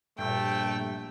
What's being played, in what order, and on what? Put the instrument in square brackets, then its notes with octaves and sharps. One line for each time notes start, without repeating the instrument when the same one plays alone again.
[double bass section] A#1 A#2 [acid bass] G2 [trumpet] A3 [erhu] G5